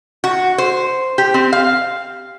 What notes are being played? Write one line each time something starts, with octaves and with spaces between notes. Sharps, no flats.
F#4
C5
G4
C4
F5